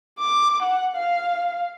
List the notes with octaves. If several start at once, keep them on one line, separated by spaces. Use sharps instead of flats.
D6
F#5
F5